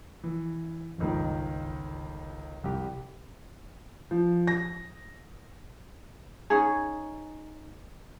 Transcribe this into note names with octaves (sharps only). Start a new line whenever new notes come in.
E3
G1 C#2 D#3
C2 G4
F3
A#6
C#4 D#4 G#4